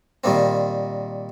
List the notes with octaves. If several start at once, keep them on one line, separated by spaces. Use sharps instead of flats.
A#2 D#3 G3 A#3 C4